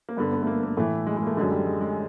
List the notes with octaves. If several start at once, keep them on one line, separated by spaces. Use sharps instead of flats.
A#3
G2 D3 B3
B3
A3
A#3
A#3
A2 E3 A3
G#3
G#3
A#3
A3
F#2 D3 G#3
G3
G#3
G#3